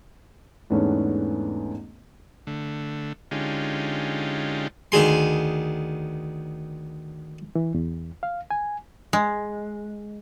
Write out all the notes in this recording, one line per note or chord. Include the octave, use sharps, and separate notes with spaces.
E2 G#2 A3 B3 C#4 D4
D3 A3
D3 G#3 C#4 D#4 F4 G4
D2 D#3 G#4 C6
E3
E2
F5
G#5
G#3